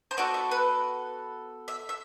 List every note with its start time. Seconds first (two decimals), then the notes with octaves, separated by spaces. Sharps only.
0.11 C5
0.17 B3 F#4 A4 D5
0.34 E5
0.51 B4
1.68 E5
1.89 E5